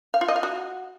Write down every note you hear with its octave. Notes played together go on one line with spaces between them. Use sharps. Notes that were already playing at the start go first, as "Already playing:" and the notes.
F5
F4
D#5
F5
F#4